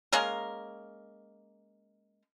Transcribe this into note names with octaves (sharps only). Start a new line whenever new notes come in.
G#3 A#3 C#4 A#4